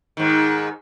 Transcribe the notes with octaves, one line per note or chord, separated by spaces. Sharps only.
G#2 D#3